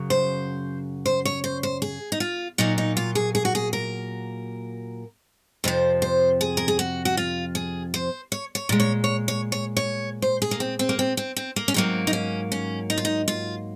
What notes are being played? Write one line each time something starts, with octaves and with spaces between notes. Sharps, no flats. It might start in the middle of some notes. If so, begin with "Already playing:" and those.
Already playing: F#2 C#3 F#3
C5
C5
C#5
C5
C5
G#4
D#4
F4
A#2 F#3 A#3 D#4
D#4
F4
G#4
G#4
F#4
G#4
A#4
F2 C3 F3 C5
C5
G#4
A#4
G#4
F#4
F#4
F4
G#4
C5
C#5
C#5
A#2 G#3
C#5
C#5
C#5
C#5
C#5
C5
G#4
A#3
C4
C4
A#3
C4
C4
C4
A#3
C#4
G#2 F#3 A#3 C4
D#4
C#4
C#4
D#4
F4
D#4
F4